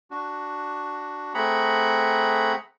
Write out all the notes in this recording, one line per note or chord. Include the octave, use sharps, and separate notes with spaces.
D4 F#4
A3 C4 G#4 F#5 A#5 B5